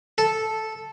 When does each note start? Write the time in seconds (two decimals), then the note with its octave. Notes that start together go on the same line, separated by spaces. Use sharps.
0.18 A4